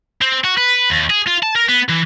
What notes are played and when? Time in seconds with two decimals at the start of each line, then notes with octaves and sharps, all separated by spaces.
0.21 C4
0.44 F#4
0.57 B4
0.90 D#2
1.10 G#4
1.27 F4
1.43 A5
1.56 A#4
1.69 B3
1.89 E3